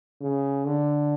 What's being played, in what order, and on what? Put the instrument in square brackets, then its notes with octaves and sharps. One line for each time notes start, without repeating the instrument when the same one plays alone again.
[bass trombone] C#3
D3